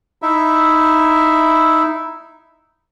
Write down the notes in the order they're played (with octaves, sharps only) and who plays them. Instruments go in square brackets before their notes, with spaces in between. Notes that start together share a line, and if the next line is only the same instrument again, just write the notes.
[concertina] D#4 E4 E5